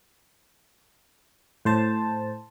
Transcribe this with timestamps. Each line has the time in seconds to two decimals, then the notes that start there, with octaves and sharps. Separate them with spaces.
1.65 A2 C5 A5